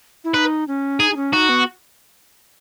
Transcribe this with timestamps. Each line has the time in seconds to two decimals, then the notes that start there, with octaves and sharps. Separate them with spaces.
0.24 E4
0.34 D#4 B4
0.68 C#4
0.99 D#4 G#4
1.11 D#4
1.16 C#4
1.32 D#4 F#4
1.49 B3